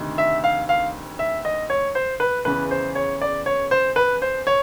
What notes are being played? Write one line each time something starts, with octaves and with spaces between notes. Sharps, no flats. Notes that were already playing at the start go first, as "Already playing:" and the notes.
Already playing: D2 C3 D#3
E5
F5
F5
E5
D#5
C#5
C5
B4
E2 C#3 E3 B4
C5
C#5
D5
C#5
C5
B4
C5
C#5